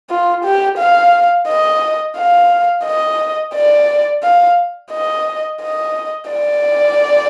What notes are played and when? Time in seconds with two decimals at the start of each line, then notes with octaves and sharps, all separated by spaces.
0.10 F4
0.45 G4
0.78 F5
1.48 D#5
2.17 F5
2.85 D#5
3.55 D5
4.23 F5
4.92 D#5
5.62 D#5
6.31 D5